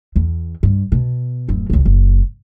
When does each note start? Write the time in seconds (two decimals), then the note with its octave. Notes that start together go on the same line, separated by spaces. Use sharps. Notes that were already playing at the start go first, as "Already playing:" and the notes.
0.16 E2
0.63 G2
0.92 B2
1.49 D1 F#2
1.70 F#1 C#2
1.85 F#1